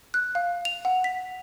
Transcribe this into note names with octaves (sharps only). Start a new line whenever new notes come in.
F#6
F5
F7
F#5
B6